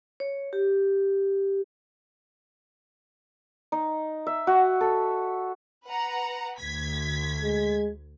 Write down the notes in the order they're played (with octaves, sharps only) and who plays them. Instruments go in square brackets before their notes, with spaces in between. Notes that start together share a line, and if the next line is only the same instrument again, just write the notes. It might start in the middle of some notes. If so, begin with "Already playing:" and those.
[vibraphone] C#5
G4
[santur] D#4
E5
F#4
A4
[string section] B4 F#5 A#5
D2 G#6 B6
[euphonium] G#3